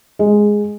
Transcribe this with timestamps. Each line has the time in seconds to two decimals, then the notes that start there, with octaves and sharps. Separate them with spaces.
0.19 G#3